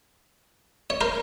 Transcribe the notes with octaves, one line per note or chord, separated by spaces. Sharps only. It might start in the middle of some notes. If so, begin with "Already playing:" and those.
C#5
A#4 C5